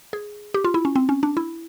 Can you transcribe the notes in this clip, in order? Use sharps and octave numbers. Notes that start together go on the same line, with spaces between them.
G#4
G4
F4
E4
C#4
C4
C#4
D4
E4